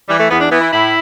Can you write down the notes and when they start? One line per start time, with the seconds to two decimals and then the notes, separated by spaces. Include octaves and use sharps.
0.08 E3 G3
0.19 A3
0.30 E2 B3
0.41 D4
0.51 E3 B3
0.61 E4
0.72 A2 E4